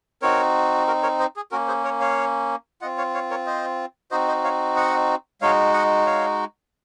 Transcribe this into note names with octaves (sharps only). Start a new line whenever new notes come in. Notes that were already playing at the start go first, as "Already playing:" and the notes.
C4 D#4 F#4 A#4 C#5
F#4 A#4
A#4 C#5
C5 D#5
G#4
A#3 C#4 F#4 A#4
G#4 C5
A#4 C#5
C#5 F5
C4 F4 D#5 F#5
C#5 F5
C#5 F5
A#4 C#5
C5 D#5
C4 D#4 F#4 C5 D#5
C5 D#5
C#5 F5
D#5 F#5
G#3 D#4 F#4 C#5 F5
D#5 F#5
C#5 F5